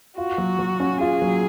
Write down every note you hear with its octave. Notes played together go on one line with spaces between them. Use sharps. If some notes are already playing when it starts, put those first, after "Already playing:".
F4 F#4
F#3
F#3
C#4
F4 G#4
F#3